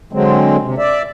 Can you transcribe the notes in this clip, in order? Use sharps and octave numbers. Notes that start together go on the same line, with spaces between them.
D3 F#3 G#3 C4
C3
D5 E5